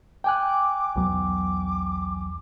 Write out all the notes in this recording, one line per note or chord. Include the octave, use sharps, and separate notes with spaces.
G5 G#5 D6 F#6
B1 E2 F#3 D6